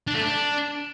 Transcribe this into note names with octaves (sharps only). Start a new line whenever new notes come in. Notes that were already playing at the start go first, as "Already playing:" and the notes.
D4
A3
D4